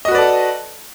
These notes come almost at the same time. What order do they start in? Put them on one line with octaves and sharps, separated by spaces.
D#5 F#4 B4 D5 A4